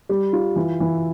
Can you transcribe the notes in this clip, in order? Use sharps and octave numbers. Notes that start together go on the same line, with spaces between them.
G3
F4
E3
E3